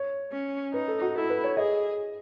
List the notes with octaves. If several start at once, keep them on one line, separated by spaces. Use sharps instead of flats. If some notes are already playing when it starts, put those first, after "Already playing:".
Already playing: C#5
C#4
D#4 B4
A4
F#4
E4 A4
B4
C#5
G#4 D#5